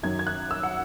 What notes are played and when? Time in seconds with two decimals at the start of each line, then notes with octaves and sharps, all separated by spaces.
0.03 F#2 D#3 F#3 G#6
0.19 G#6
0.27 F#6
0.51 E6
0.63 F#5